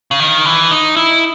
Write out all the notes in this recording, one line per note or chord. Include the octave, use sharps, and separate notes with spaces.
C#3
D#3
E3
D#4
E4